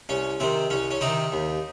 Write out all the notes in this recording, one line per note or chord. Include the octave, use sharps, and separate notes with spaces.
C2 C#4
C3 D#3 C4
C2 C#4
C#4
C3 C4 D#4
D#3
D#2